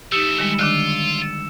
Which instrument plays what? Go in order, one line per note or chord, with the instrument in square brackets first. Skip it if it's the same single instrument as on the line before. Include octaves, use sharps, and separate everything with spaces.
[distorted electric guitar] E3 A3 [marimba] D#4 G4 [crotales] E6 C#7 E7
[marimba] D#3 G3 G#3
[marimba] D3 D#3 D4 [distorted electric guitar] F4